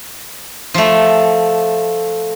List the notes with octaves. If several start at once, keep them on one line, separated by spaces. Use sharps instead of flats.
F3 A3